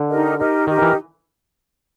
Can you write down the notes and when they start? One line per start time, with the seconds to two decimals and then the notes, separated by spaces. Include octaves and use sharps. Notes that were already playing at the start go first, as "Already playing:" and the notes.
Already playing: D3
0.09 D#4 G4 A#4 D#5
0.38 D#4 G4 A#4 D#5
0.67 D#3 D#4 G4 A#4 D#5
0.82 E3